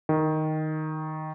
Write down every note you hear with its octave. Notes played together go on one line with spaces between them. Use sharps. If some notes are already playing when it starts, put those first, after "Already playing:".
D#3